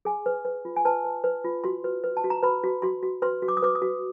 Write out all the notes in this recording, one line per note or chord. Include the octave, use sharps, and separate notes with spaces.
G#4 G#5
B4
B4
F4
G#5
B4 A5
B4
B4
F4
F#4 C6
B4
B4
A5
F#4
A#5
B4 B5
F#4
F#4 C6
F#4
B4 C6
F#4
D6
D#6
B4 D6
D#6
F#4